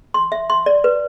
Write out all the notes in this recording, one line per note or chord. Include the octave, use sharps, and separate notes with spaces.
C6
E5
C6
D5
B4